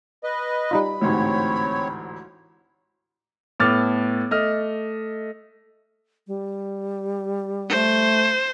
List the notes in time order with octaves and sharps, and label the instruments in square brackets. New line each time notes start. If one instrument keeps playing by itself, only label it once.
[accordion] B4 D#5
[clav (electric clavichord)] G3 D#4 F4 [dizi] B5
[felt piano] A1 D2 G#2 [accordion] C4 C#5
[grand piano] A2 B3 A4 D6 F6 A6
A3 D#5 F6
[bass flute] G3
[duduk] A3 [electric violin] C5